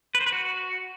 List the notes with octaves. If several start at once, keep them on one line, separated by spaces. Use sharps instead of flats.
B4
C5
B4
F#4